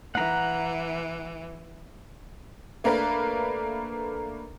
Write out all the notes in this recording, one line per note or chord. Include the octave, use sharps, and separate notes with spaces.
E3 F#5 A#5
A3 A#3 D4 A#4 B4